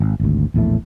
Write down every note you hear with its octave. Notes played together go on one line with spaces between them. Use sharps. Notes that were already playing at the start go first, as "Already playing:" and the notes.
G#1
G#1 D2
A#1 E2 A2 A3